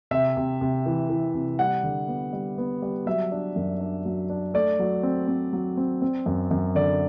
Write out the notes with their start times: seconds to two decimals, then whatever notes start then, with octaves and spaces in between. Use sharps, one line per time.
0.11 C3 E5
0.37 C3
0.61 C3
0.86 E3
1.10 E3
1.34 C3
1.59 G3 F#5
1.83 D3
2.08 B3
2.33 G3
2.58 B3
2.82 G3
3.06 F#3 E5
3.32 D4
3.56 F#2
3.81 D4
4.05 F#3
4.29 D4
4.54 A3 D5
4.79 F#3
5.03 C4
5.28 C4
5.53 F#3
5.77 C4
6.02 C4
6.26 F#2
6.51 F#2
6.75 D3 D5